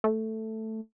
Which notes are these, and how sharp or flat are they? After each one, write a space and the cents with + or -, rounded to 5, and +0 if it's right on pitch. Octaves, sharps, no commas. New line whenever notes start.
A3 +5